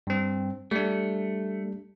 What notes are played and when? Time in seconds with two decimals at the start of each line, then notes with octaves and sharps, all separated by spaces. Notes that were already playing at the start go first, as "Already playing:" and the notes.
0.07 G2 C4
0.71 G3 A3 D4